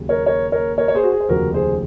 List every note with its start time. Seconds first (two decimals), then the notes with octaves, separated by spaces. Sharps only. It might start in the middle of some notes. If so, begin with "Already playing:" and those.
Already playing: D#2 C#3 F#3 A#3
0.09 A#4 C#5
0.26 A#4 C#5
0.52 A#4 C#5
0.78 A#4 C#5
0.88 C#5
0.95 G#4 C5
1.03 F#4
1.12 G#4
1.20 C5
1.29 F1 D#2 C#3 F3 F#4 A#4
1.54 G#4 C5